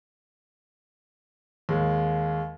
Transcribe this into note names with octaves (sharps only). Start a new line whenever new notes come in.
D#2 G#3